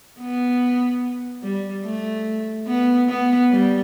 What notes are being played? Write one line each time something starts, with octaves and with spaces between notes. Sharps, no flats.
B3
G3
A3
B3
B3
G3